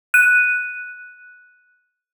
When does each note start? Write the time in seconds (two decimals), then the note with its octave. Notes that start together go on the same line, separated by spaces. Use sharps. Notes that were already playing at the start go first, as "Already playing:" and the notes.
0.14 F#6 D#7